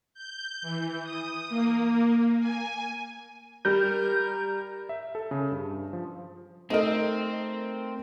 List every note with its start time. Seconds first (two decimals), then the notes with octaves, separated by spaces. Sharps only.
0.14 G6
0.62 E3
1.03 D#6
1.49 A#3
2.40 G#5
3.65 G3 A#4 G6
4.89 E5
5.15 A4
5.31 C#3
5.52 G2
5.93 F3
6.70 A3 C4 D#4 A4 A#4 D#5